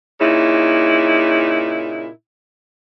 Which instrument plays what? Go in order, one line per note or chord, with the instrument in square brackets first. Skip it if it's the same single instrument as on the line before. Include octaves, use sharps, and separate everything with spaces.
[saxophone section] A#2 C#3 D#4 E4